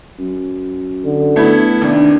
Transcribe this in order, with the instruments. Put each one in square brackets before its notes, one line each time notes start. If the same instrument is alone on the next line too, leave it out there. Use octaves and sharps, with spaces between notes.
[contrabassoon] F#2
[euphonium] D3
[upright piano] A3 B3 G#6 [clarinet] E4
[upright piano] D#2 C3 [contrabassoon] D#3 [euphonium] D4